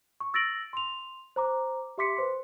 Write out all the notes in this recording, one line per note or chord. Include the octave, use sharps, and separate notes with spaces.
C#6
E6 A6 A#6 D7 F#7
C6 F7
C5 A#5 D6
G4 E5 C6 D6 B6 C#7
B4 C5 C6